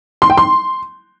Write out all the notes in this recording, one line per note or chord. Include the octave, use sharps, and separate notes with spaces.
C6
G5
C6